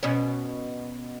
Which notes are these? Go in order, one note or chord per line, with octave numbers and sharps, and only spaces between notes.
B2 C#4